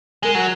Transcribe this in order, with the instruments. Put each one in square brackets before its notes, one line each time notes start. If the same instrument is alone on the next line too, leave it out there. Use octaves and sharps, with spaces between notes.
[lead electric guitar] G#3 [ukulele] A#4
[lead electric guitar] F#3